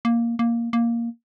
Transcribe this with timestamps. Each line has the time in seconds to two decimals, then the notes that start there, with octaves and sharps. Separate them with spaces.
0.05 A#3
0.39 A#3
0.73 A#3